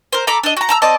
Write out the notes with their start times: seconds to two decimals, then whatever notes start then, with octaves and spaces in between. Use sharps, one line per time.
0.13 A#4 C5
0.27 A4 A#5 B5 D6
0.43 D4 D#5
0.57 F#4 A#5
0.69 A5 A#5 E6
0.82 C4 D5 D#5 A5